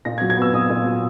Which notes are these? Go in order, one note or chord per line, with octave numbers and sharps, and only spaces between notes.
A#2 A#6
G#6
F#3
G#6
B3
E6
A#2 D#6
A#2
F#3